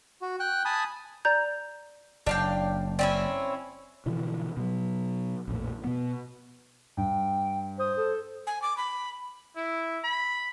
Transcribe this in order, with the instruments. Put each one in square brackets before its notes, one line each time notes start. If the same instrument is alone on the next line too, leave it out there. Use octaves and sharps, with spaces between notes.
[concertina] F#4
G5 F#6
G#5 A5 B5 D#6
[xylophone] D5 A#5 G6
[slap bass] F#1 [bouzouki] D4 F5 G5
[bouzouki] C4 C#4 E4 [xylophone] D5 G5
[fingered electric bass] B2 D3 E3 F3
B2 F#3
A#1 F2 A2
B2 B3
[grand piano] G2 [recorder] G5
[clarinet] C5 [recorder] D#6
[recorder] A4
G#5
D6
B5
[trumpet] E4
B5